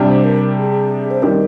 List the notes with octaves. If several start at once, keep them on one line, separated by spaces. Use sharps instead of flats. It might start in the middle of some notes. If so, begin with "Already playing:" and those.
Already playing: C3 G3 D4 G4
C5
A#4
G#4
C5
D#3 G3 C4 G4 A#4